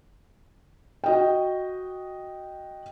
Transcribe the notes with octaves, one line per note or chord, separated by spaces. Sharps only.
F#4 D#5 G5